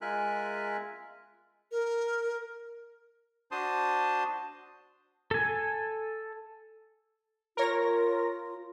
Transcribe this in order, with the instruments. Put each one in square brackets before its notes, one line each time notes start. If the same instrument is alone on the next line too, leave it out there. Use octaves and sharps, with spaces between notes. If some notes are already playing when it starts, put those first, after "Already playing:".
[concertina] G#3 F4 A#4 E5 G#5 F#6
[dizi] A#4
[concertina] D4 F#4 C5 A5 C6 D#6
[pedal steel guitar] A4 G#5
[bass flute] F4 [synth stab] A#4 C#5 A#6